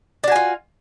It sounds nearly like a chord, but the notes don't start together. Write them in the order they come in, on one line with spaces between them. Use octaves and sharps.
D4 F#4 G#5 F4